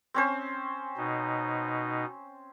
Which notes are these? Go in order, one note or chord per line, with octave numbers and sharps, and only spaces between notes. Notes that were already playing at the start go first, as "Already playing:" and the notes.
C4 C#4 C5
B2 D#4